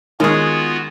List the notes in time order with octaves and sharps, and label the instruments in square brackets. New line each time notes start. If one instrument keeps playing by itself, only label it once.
[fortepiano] D#3 G#3 [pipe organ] B3 F4 F#4 [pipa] C#4 G#4